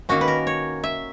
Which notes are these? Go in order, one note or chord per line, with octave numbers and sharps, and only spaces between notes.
D#3 A#3 C#4 F#4
B4
A#4
C#5
E5